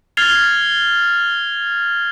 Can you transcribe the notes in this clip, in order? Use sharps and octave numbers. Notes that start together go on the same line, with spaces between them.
F6 G#6 A6 C7 F7 G7